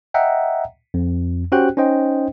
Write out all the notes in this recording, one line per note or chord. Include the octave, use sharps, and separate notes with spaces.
D#5 E5 F#5 G5 A#5
F2
C#4 F#4 G4 C5 G5 F#6
C#4 D#4 C5 D#5 G5